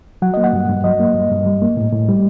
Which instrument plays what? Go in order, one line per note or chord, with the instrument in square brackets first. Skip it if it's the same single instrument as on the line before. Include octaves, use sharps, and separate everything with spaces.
[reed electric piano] F#3 F#5
A#3 D#5
F#5
G2
G2
F#3 D#5
A#3
G2
G2
G3
A#3
A2
A2
G3